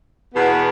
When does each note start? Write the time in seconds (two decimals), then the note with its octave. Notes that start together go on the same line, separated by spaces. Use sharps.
0.33 E2 B2 B3